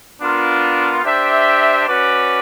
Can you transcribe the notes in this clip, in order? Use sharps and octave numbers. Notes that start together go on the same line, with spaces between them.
B3 D4 F4 A#4
D4 G4 C5 E5 G5
C#4 F#4 B4 D5